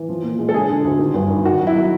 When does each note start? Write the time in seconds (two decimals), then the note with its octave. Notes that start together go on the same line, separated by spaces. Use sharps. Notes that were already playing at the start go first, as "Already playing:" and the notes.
Already playing: E3
0.09 F3
0.23 A#2
0.39 G#3
0.49 A4
0.54 D3 G#4
0.69 D3
0.85 D2
0.99 D#3
1.14 G2
1.30 D#3
1.45 D#3 F#4
1.59 F#3
1.67 E4
1.75 F#3